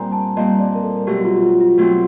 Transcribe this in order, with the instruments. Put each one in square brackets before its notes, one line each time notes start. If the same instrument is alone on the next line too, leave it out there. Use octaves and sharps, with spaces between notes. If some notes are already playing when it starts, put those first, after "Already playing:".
Already playing: [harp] A#2 G3 C4 [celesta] G#5 A#5
[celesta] A5
[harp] A#2 G3 C4 [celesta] D#5
[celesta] D5
A#4
A4
[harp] B2 F#3 A3 C4 [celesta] G4
[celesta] F#4
F4
F4
F4
[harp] B2 F#3 A3 C4